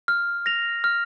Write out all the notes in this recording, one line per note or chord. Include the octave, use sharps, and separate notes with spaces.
F6
A#6 F7
F6